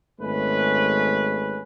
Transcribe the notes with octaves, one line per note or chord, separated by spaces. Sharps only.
G#1 G#3 A3 C#4 B4